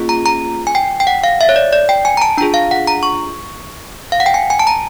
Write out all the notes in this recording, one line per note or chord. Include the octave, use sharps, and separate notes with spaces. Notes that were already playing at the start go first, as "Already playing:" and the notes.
Already playing: A#3 C#4 F4 G#4
A#5
A#5
G#5
G5
G5
F#5
F5
E5
C#5
D5
D5
G5
G#5
A#5
A5
D4 F4 G#4 A#5
F5
F#5
A#5
C#6
F5
F#5
G5
G#5
G#5
A5
A#5